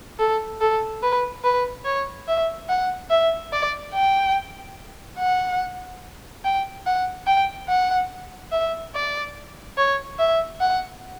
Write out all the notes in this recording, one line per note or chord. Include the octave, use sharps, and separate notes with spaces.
A4
A4
B4
B4
C#5
E5
F#5
E5
D5
G5
F#5
G5
F#5
G5
F#5
E5
D5
C#5
E5
F#5